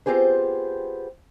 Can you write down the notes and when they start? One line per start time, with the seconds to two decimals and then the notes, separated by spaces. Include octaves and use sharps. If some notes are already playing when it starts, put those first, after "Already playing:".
0.06 B3 C4 F4 G4 G#4 C5